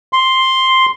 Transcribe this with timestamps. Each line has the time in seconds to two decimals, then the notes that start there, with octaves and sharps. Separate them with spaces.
0.13 C6